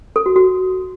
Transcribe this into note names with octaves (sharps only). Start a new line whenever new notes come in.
A4
F#4
F#4